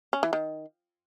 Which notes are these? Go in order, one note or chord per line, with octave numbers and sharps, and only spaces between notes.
C#4
E3
D#3